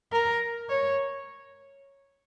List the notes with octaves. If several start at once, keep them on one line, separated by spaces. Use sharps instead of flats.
A#4
C#5